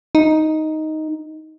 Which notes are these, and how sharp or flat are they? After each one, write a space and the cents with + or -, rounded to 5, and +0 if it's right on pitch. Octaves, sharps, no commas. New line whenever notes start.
D#4 +5